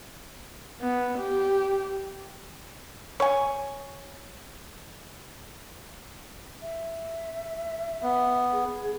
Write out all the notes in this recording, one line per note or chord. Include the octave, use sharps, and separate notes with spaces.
B3
G4
C#5 G#5
E5
B3
G#4